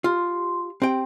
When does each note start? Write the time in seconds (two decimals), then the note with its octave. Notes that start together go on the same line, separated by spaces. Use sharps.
0.04 F4 G4 C6
0.82 C4 G4 G5